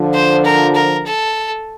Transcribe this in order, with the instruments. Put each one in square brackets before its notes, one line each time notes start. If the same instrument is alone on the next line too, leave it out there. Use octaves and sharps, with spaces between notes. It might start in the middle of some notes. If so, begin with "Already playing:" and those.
Already playing: [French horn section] D3 F3
[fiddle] C5
A#4
A#4
A4